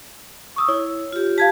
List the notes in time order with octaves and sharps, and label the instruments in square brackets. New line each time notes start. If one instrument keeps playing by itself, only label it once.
[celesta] C#6 D#6 E6
[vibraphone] E4 [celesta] C#5
[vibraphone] F4 G4
[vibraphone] G4 A5 [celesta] F5 G#6 B6